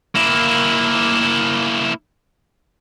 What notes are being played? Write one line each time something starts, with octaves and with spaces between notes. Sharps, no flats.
A#3 E4